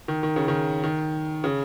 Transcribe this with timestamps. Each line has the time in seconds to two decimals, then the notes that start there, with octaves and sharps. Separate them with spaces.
0.08 D#3
0.23 D#3
0.36 C#3
0.48 D#3
0.84 D#3
1.44 C#3